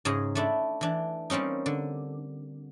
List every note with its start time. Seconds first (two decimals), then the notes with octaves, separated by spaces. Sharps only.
0.05 G#2 C#3 G#4 D#5 A#5
0.35 A3 D4 E4
0.81 E3 D4
1.30 G3 A#3 C4 C#4 D#4
1.66 D3